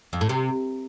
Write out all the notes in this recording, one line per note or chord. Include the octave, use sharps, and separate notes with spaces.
F2
A2
C3